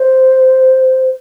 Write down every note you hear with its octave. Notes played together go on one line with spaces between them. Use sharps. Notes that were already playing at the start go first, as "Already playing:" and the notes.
Already playing: C5